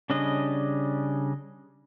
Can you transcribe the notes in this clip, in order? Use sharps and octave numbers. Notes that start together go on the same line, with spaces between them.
C#3 G3 C#4 D4 D#5